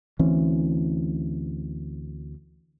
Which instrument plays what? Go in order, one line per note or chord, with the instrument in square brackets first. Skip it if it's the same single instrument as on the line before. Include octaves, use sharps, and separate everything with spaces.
[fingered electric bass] D2 E3 C4 C#4